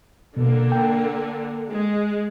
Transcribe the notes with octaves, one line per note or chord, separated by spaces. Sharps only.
B2 D3 A#3
G5
G#3